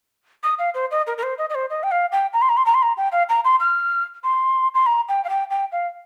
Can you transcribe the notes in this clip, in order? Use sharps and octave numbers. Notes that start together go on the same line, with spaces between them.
D#6
F5
C5
D#5
A#4
A#4
C5
D#5
D#5
C5
D#5
G5
F5
G5
A#5
C6
A#5
C6
A#5
C6
A#5
G5
F5
A#5
C6
F6
C6
C6
A#5
G5
F5
G5
G5
F5